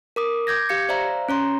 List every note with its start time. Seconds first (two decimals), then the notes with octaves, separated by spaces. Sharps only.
0.16 A#4 D6 D#6
0.47 D6 G6 G#6 A#6
0.69 G4 F5 G#6 C#7
0.89 C5 D5 E5 F5 A#5
1.29 C#4 C#5 A#5 C6